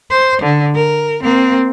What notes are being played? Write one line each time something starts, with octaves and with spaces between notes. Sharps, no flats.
C5
D3
A#4
A#3 C4